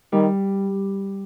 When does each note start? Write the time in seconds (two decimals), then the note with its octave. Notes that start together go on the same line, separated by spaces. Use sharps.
0.12 D#3 G3